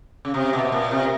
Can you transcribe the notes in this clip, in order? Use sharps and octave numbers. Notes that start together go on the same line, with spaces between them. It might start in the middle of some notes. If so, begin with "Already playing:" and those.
C#3
C3
B2
B2
A#2
C3